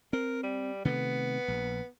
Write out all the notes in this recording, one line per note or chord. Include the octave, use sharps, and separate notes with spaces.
C4 A#4
G3
C3 D#3 A3 B3
A#1